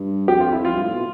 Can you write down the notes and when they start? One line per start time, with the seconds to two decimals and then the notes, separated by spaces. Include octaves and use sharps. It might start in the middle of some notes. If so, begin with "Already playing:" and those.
Already playing: G2
0.28 F2 G4
0.40 F4
0.52 E4
0.65 F2 F4
0.74 G2
0.83 A2
0.93 B2